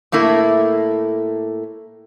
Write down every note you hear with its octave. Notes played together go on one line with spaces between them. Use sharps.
A2 A3 A#3 E4